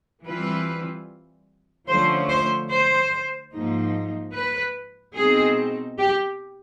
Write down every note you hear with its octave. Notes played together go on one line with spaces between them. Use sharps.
E3 G3 C4 F4 B4
D3 F3 A3 C#4 C5
C5
C5
G#2 F3 A#3 D#4
B4
B2 G#3 C4 D#4 G#4
G4